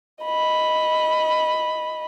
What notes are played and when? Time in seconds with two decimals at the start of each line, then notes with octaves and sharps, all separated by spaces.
0.25 D#5 B5